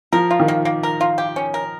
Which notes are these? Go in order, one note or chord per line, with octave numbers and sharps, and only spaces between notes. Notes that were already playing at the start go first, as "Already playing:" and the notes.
F3 A#4
F4
D#3
A#3
A#3
A#4
F4
G4
C#4
A#4